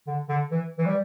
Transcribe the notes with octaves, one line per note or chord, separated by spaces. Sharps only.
D3
D3
E3
E3
G3